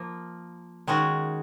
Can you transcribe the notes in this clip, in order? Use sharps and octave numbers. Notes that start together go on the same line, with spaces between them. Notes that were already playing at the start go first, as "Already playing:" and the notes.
Already playing: F3 A#3
D#3 G#3 C#4 F#4